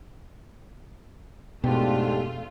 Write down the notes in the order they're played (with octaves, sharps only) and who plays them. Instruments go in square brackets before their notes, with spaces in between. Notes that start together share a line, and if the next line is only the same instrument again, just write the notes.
[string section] F2 A3 F4 [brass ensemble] G#2 D4 [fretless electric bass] B2 [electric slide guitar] G4